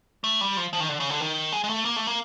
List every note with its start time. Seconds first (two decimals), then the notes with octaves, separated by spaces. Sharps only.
0.24 A3
0.41 G3
0.57 F3
0.73 F3
0.80 D#3
0.89 D3
1.00 C#3
1.10 D3
1.20 D#3
1.53 G#3
1.64 G#3
1.69 A3
1.85 A#3
1.96 A3
2.07 A#3